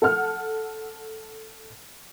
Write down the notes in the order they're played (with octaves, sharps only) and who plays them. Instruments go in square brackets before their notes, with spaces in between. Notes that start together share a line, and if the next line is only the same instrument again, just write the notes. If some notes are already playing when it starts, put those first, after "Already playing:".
[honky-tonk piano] A4 F#5 F6